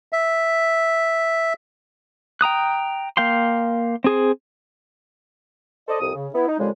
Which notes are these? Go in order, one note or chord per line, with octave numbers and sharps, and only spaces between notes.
E5
G5 A#5 D#6 F#6
A#3 F5 G5 C6
C4 G#4 C5
A4 C5 D5 D#5
C2 F2 D#6
C#3
B3 E4
D#4
F2 A#2 C#3 G3 G#3